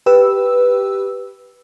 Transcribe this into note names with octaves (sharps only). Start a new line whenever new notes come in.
G4 B4 E6